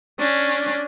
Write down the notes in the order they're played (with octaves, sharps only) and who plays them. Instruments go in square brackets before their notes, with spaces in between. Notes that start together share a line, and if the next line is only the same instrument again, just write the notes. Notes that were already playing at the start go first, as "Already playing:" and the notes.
[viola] C#4 D4